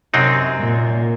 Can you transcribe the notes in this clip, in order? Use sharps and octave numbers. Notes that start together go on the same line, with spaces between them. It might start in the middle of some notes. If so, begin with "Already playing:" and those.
F#2 C3 F#3 C4 D#4
A#2